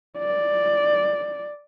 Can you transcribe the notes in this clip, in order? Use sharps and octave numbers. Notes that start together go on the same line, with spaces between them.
D5